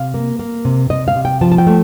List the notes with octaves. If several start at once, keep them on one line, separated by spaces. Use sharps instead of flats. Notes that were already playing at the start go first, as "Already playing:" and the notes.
Already playing: C3 F5
A#3
A#3
C3
C3 D#5
F5
C3
G5
F3 A5
A5
G5
A3